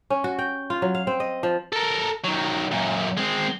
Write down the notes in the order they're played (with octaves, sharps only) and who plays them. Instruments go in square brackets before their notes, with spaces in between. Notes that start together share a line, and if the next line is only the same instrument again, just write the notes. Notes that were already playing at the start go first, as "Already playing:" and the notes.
[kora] C#4
F#4
G5
F4
F#3
F5
C4
D#5
F3
[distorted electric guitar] A4 A#4
D#3 F#3
F#2 A#2
G#3 C4